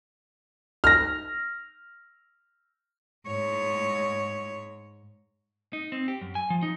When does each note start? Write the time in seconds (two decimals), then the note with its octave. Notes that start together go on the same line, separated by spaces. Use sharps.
0.84 F6 A#6
3.28 G#2 C#5
5.73 D#4
5.92 C4
6.08 G4
6.21 F#2
6.35 G#5
6.50 F3
6.63 D#4